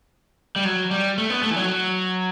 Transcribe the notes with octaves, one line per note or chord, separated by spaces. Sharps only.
G3
F#3
G3
A3
B3
A3
E3
F#3